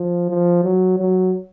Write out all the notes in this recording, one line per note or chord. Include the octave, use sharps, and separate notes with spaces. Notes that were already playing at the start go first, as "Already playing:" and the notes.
Already playing: F3
F3
F#3
F#3